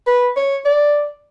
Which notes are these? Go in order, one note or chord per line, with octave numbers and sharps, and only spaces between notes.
B4
C#5
D5